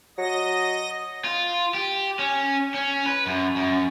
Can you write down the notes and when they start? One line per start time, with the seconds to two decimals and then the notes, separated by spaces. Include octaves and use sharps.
0.18 F#3 D#5 A#6
1.25 F4
1.74 G4
2.19 C#4
2.74 C#4
3.06 B4
3.27 F#2
3.56 F#2